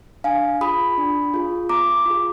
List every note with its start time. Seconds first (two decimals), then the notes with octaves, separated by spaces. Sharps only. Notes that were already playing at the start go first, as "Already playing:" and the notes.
0.24 D4 F5 G#5
0.61 F4 G#4 B5 D#6
0.98 D4
1.34 F4 G#4
1.69 B3 A#5 D6
2.06 F4 G#4